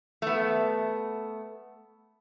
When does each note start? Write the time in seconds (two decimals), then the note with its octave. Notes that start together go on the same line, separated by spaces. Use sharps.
0.22 A3 B3